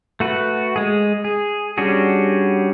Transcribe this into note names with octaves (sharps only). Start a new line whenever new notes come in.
A3 F#4 B4
G#3 G#4
G#4
G3 C#4 D4 F#4 G#4